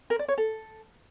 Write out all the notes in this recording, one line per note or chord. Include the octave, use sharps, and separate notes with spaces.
A#4
D5
C#5
A4